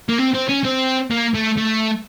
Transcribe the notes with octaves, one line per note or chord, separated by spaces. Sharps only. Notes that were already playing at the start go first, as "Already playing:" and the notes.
A#3
C4
C4
C#4
C4
A#3
A3
A3